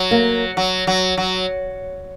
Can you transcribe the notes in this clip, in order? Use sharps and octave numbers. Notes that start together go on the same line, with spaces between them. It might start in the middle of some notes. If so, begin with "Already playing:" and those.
Already playing: F#3
A#3
F#3
F#3
F#3